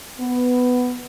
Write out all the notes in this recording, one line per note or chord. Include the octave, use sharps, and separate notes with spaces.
B3